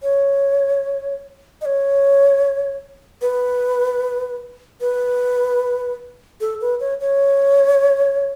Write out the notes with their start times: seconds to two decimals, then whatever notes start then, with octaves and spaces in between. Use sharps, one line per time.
0.02 C#5
1.61 D#5
1.65 C#5
3.22 B4
4.81 B4
6.41 A4
6.61 B4
6.80 C#5
7.01 C#5